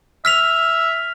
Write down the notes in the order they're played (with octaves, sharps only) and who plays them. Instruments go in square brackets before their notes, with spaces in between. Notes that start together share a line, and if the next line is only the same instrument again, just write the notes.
[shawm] E5 [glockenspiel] F6 B6 F7